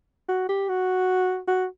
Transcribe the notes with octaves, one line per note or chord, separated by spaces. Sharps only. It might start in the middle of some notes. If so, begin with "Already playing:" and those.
F#4
G4
F#4
F#4